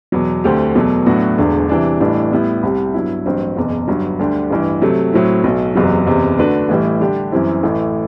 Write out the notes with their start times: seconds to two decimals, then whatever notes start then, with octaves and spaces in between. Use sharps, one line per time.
0.12 E2 B2 F#3
0.44 D2 D3 A3 C4 G4
0.75 E2 B2 F#3 A3
1.06 A2 F#3 B3 D4 F#4
1.38 E1 E2 D3 A3 D4
1.69 C3 E3 G3 D4
2.00 A1 A2 E3 G3 D4
2.32 A2 G3 B3 E4
2.63 C2 C3 G3
2.94 G2 F#3 B3 E4
3.26 A1 G2 F#3 C4
3.57 F#1 E2 B2
3.88 G1 G2 F#3
4.19 D2 D3 G3 D4 G4
4.51 A1 G2 E3
4.81 C3 F#3 A3
5.13 A2 F#3 C4 E4
5.44 B1 B2 F#3
5.75 F#1 E2 C3 F#3
6.07 F#1 E2 C3
6.38 D3 A3 D4 F#4 B4
6.69 A1 A2 E3 G3
7.01 D3 G3 D4 G4
7.32 F#2 E3 G3 C4 E4
7.63 A1 A2 E3 A3